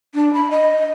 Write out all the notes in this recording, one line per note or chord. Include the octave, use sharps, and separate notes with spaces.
D4
B5
D#5